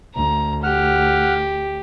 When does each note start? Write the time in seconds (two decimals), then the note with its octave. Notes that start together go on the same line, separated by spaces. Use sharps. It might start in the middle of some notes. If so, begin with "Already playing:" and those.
0.16 D2 A#5
0.63 G4 F#5 F6